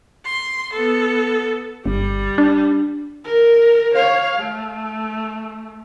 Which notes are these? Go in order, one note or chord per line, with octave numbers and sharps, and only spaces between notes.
C6
B3 A4
G1 G3
D4
A#4
C#5 F5
A3